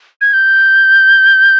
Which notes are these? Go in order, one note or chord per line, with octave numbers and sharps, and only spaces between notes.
G#6
G6